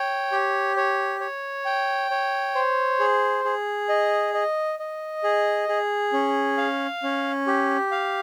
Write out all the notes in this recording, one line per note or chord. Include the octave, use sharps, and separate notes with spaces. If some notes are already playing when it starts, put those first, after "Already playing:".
Already playing: C#5 G5
G4
C#5
C#5
G5
C#5
C5
G#4
G#4
D#5
D#5
D#5
G#4
G#4
C#4
F5
C#4
G4
F5